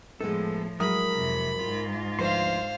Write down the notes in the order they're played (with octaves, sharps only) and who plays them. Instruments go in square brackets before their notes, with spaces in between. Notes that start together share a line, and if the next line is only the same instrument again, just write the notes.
[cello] A2 F3 [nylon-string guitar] G#3 B3 D#4 [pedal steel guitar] A4
[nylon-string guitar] F#3 G#3 E4 [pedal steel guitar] A#4 D#6 [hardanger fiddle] B5
[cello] F2 C3
G#2 F4
[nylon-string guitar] D2 F3 B4 [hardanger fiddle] C5 F5 [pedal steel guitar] C6